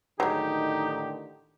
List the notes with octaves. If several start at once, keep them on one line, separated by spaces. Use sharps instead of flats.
A2 D3 D#3 F#3 G#3 D#4 G4